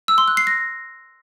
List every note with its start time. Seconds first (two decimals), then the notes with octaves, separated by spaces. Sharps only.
0.08 E6
0.18 C6
0.28 F#6
0.37 C7
0.47 A#6